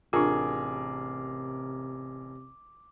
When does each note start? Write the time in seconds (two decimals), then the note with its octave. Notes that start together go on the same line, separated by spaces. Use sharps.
0.13 A1 C3 D4 F4 G#4 A#4 D6